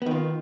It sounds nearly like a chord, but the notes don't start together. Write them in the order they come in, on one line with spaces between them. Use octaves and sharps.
B3 D#3 F4